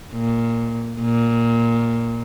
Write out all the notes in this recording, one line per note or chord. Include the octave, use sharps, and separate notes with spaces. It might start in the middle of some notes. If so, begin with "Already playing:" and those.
A#2
A#2